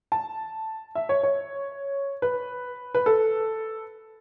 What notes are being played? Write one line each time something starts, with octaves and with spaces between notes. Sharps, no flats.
A5
E5
C#5
C#5
B4
B4
A4